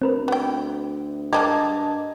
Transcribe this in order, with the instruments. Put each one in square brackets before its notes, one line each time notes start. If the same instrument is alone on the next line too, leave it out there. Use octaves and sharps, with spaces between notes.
[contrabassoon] D2 [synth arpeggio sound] C4 A#4 B4
[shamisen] B3 G5
[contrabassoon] G2 [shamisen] G#3 A#3 G4 [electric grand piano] D#5 A5 G#6